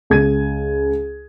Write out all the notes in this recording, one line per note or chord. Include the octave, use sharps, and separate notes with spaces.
C#2 G#6 D#7